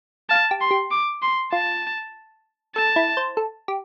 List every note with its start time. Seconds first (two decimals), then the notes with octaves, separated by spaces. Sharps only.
0.30 F5 A5
0.51 G4
0.61 C6
0.71 G4
0.91 D6
1.22 C6
1.52 F4 A5
2.76 A4 A5
2.96 E4
3.17 C5
3.37 A4
3.68 G4